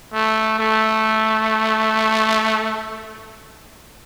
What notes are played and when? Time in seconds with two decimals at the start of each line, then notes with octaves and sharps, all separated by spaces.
0.13 A3
0.58 A3